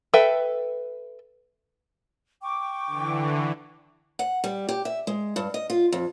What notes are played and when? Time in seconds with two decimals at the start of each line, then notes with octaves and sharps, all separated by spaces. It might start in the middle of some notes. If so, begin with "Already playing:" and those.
0.14 A4 B4 E5 G5
2.42 G5 C#6 D6
2.87 D3 E3
4.19 F#5
4.44 G3
4.69 G4
4.85 E5
5.07 G#3
5.36 G2
5.54 D#5
5.70 F4
5.92 F2